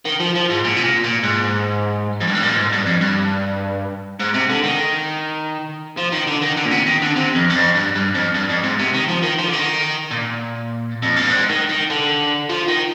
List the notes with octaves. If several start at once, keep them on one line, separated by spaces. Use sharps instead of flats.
D#3
F3
F3
G#2
A#2
C3
A#2
A#2
G#2
F2
G2
G#2
A#2
G#2
G2
F2
G2
G#2
C3
D3
D#3
F3
D#3
D3
D#3
D3
A#2
C3
D#3
D3
C3
F2
G2
F2
G2
G2
F2
G2
F2
G#2
C3
D#3
F3
D#3
F3
D3
D#3
A#2
F2
G2
G#2
D#3
D#3
D3
F3
D#3